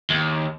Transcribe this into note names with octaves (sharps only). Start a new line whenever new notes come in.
D#2